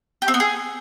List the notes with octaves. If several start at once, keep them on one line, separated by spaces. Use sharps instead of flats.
G4
C4
B3
G#4